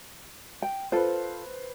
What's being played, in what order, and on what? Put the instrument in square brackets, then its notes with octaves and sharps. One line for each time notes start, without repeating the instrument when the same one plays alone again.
[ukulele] G5
[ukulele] F4 A4 [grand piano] B4 C5